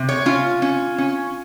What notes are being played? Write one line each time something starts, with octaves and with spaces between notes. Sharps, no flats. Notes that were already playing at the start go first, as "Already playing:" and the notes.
Already playing: C3
C#5
C#4 F4
C#4
C#4